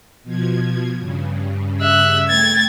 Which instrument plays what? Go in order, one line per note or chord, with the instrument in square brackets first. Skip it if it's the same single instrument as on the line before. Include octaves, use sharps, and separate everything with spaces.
[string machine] B2 F3 G#6
G2 C#3
[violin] E5 F#6
[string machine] A3 G5 [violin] G#6 A6